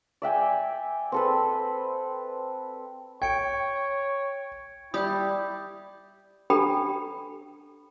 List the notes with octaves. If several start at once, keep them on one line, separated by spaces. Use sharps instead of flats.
D5 E5 G5 G#5
C4 A4 B4
C#5 G5 G#6 C#7 D7
G3 E4 G4 D#6 G6
D4 G4 A4 G5 A#5 B5